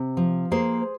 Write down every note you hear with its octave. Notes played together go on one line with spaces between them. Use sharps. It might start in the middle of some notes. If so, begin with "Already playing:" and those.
Already playing: C3
F3
A#3 G#4 C5